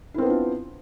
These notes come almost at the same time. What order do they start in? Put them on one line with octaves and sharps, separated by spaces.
E4 C4 B3 D4 F4